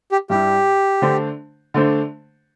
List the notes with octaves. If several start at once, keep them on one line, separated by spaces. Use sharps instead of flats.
G4
G2 G3 E4 G4
D3 A3 D4 C5
D3 A3 D4 C5